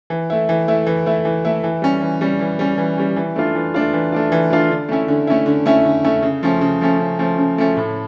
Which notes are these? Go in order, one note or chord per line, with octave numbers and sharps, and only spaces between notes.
E3
A3 E4
E3
A3 E4
E3
A3 E4
E3
A3 E4
E3
G3 C#4
E3
G3 C#4
E3
G3 C#4
E3
G3 C#4
E3
A3 D4 F4
E3
A3 D4 F4
E3
A3 D4 F4
E3
A3 D4 F4
D3
A3 C#4 E4
D3
A3 C#4 E4
D3
A3 C#4 E4
D3
A3 C#4 E4
C#3
F3 A3 C#4
C#3
F3 A3 C#4
C#3
F3 A3 C#4
C#3
F3 A3 C#4
A2